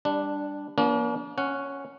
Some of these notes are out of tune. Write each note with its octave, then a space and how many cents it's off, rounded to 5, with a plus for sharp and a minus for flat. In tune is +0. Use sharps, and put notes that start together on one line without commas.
G3 +20 D4 +0
F3 -20 A#3 +30 D4 -45
C#4 +0 F#5 +0